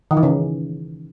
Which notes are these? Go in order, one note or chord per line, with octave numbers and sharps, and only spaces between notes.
D#3
E3
C#3